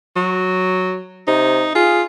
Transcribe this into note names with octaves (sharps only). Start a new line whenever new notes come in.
F#3
C3 D#4
F4 G#4